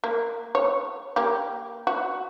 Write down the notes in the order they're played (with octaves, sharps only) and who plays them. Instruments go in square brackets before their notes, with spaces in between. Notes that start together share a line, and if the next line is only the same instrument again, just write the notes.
[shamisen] A#3
C#5
A#3 G4
F#4